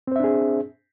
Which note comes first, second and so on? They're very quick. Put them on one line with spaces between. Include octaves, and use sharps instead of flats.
C4 C5 E5 D4 G#4